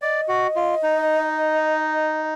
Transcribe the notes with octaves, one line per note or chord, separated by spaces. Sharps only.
D5 D#5
F#4
F4
D#4